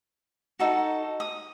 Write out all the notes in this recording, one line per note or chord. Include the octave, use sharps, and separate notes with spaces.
D#4 F#4 A4
D#6